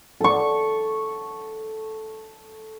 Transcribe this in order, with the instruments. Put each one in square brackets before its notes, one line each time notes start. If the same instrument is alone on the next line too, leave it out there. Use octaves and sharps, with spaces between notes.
[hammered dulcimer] A4 C#6